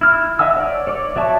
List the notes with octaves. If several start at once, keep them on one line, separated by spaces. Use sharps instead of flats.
E4 F6
D#5 E5 F#5 G#5 E6
C#5 D5
C#5 D5 D6
F#3 D5 E5 A5 C#6